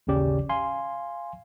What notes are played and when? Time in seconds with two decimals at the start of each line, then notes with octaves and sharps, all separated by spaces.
0.07 A1 D#2 C#3 C#4 G4 D5
0.49 F5 G#5 C6